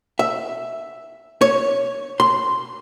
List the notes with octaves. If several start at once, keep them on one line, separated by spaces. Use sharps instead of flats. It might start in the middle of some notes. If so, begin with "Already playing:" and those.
E5
C#5
C6